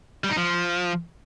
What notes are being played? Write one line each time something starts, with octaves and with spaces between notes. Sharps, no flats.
G3
D#4
F3